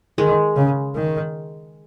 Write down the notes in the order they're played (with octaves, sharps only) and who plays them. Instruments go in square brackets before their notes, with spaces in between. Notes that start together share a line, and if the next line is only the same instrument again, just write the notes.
[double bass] D#3 [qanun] G#3
[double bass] C#3
D#3